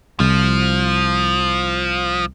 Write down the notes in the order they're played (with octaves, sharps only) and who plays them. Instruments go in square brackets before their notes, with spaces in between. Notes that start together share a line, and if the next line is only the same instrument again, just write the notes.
[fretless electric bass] C2 [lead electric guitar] F3